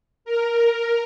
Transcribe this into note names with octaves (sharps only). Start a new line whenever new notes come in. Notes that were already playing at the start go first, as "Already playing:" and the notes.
A#4